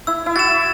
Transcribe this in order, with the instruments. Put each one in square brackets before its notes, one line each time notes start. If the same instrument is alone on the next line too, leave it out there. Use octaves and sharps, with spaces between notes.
[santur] E4 [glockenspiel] E6
[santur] E4
[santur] F#4 [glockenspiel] A6 E7